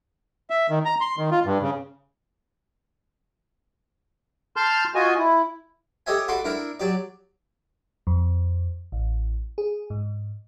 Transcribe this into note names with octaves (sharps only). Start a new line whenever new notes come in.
E5
D#3
A#5
C6
D#3
F4
G2
C#3
A5 C6 F6 G6
F4 F#4 D#5 G#5
E4
G4 A4 C#5 D#5 E5 G#5
F#4 A4 E5 B5 C6 D6
D4 E4 A#4 E5
F#3 G4 D5
F2
A1
G#4
G#2